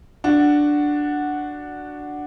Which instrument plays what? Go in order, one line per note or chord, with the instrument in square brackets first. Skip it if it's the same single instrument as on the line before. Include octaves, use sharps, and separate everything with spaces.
[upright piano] D4 F#4